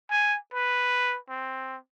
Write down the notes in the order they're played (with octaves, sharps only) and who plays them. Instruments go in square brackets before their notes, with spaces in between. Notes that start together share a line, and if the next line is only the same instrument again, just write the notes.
[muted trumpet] G#5
B4
C4